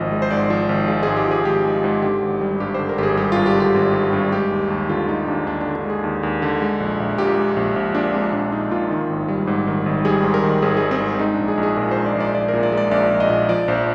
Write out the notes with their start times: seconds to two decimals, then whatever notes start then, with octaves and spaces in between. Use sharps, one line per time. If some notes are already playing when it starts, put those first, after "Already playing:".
Already playing: G#1 F3 D#5
0.12 G#3
0.22 C5
0.31 G#2 D5
0.50 F3
0.69 G#1
0.88 G#3 F4
1.03 G#2 G#4
1.16 G4
1.27 F3 G#4
1.45 G#1 G4
1.65 G#3
1.74 F4
1.84 G#2
2.02 D3 G4
2.22 G#1
2.41 G3
2.60 G2 G4
2.74 D3 C5
2.89 A#4
2.98 G#1 G4
3.03 G#4
3.17 G3 G4
3.32 G2 F4
3.46 G4
3.55 D3
3.60 G4
3.75 G#1
3.94 G3
4.13 G2
4.32 G#3 G4
4.51 D#2
4.70 D#2
4.89 D3 F4
5.08 G#3 D#4
5.28 D#2 D4
5.46 D#2 D4
5.61 D3 D4
5.76 D4
5.85 G#3 G#4
6.04 D#2
6.23 D#2
6.42 D3
6.62 G#3
6.80 A#1
7.00 A#1
7.18 A#2 G4
7.37 G#3
7.56 A#1
7.76 A#1
7.95 A#2 D4
8.14 G#3 C4
8.33 A#1 D4
8.52 A#1 D#4
8.71 A#2 F4
8.90 D#3
9.10 G#1
9.28 G3
9.47 G#2
9.67 D#3
9.86 G#1
10.05 G3 G#4
10.24 G#2
10.34 A#4
10.43 D#3
10.62 G#1 G#4
10.77 G3 G#4
10.91 C4
11.01 G#2
11.19 G#3 D#4
11.34 A#1 D4
11.48 G#4
11.58 A#1
11.63 G#4
11.77 A#2 A#4
11.91 C5
11.96 G#3
12.06 D5
12.15 A#1
12.20 D5
12.34 A#1 D5
12.48 A#4
12.53 A#2
12.63 D5
12.72 G#3
12.77 D5
12.91 A#1 D5
13.10 A#1
13.20 D#5
13.30 A#2
13.49 F3 D5
13.68 A#1 C5